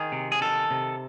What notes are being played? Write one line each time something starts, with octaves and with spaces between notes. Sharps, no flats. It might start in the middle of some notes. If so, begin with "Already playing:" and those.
Already playing: D#3 G#4
C3
G#4
D#3 A4
C3